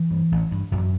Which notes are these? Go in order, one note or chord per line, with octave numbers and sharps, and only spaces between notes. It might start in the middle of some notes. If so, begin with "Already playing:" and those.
Already playing: E3
G2
A1
G2
A1 F#2 F#3